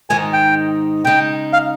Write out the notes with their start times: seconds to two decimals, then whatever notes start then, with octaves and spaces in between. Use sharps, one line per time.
0.10 G#2 D#3 G#3 D#4 G#5
0.33 G5
1.05 C#3 G#3 D#4 G5
1.53 F5